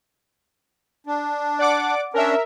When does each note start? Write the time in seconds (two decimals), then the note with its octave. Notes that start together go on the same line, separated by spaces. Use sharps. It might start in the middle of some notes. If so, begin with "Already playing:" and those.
1.07 D4
1.59 D5 F#5 D6
2.14 C#4 D4 A#4 E5